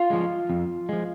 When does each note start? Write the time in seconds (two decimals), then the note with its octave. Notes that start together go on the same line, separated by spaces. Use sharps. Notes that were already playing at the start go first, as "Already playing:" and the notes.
Already playing: F4 F5
0.10 F3 G#3
0.50 F2
0.89 F3 G#3